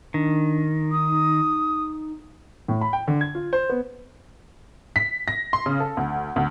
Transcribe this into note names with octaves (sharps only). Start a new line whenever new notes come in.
D#3 D4
D#4 D#6
A2
B5
G5
D3
G#6
F4
C5
B3
B6
A#6
C6
C#3
A4
D2
D2